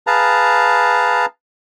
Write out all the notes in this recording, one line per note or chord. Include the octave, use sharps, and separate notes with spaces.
G#4 B4 F5 A5 A#5